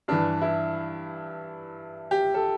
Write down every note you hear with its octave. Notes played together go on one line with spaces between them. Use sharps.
G2 E3 D4
E4
G4
A4